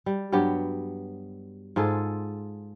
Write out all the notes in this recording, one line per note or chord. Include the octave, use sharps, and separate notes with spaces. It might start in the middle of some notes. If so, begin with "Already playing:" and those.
G3
G2 F#3 B3 G4
G#2 F4 G#4 A4